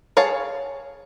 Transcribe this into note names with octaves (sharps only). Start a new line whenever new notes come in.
G#4 C#5 F5 A5